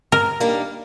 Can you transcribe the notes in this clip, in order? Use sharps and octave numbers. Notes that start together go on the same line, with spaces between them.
A#4
D#3 G3 A#3 D4